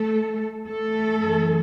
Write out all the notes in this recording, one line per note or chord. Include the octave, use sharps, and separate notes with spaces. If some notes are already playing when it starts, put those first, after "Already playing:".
Already playing: A3 A4
A3 A4
F#2 E3